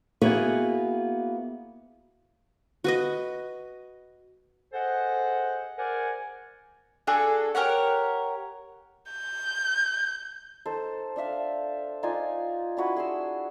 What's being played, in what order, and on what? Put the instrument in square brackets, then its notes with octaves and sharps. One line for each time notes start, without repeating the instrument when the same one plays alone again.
[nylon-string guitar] A#3 B3 E4 F#4 G#4
[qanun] F#4 B4 D#5
[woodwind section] G#4 A4 C5 D#5 F#5
G#4 A#4 C5 D5 F#5 G#5
[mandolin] D4 F#4 G#4 A4
G4 A#4 C#5 F#5
[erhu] G6
[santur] D#4 A4 C5
D4 A4 E5 F5
D#4 F4 D5 G#5
D4 E4 F#4 B4
G#4 C6 E6